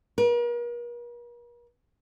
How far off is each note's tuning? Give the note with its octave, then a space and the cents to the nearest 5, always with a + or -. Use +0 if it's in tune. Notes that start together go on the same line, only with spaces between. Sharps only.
A#4 +45